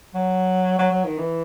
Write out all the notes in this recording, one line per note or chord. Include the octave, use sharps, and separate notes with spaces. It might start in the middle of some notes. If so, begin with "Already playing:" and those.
F#3
F#3
F#3
D#3
E3